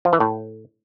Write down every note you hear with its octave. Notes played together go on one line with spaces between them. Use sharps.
F3
E3
A2